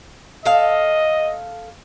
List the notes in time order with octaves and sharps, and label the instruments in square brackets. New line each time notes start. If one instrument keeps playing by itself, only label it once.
[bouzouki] A4 F5 [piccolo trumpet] D#5